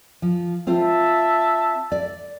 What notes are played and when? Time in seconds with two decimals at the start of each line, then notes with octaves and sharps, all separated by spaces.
0.22 F3
0.67 C4 F4 C5 E5 A5
1.92 D5